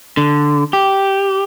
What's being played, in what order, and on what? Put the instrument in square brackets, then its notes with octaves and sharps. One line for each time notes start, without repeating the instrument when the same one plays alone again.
[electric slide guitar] D3
G4